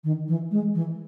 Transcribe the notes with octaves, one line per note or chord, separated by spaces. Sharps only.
D#3
E3
G#3
E3